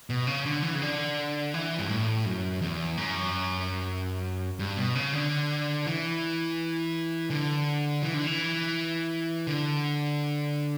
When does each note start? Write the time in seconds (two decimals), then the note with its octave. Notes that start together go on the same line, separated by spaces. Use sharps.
0.10 B2
0.27 C#3
0.45 D3
0.63 E3
0.75 C#3
0.82 D3
1.54 E3
1.79 G2
1.89 A2
2.26 F#2
2.61 E2
2.97 F#2
4.59 G2
4.77 B2
4.95 C#3
5.13 D3
5.86 E3
7.30 D3
8.03 E3
8.14 D3
8.27 E3
9.47 D3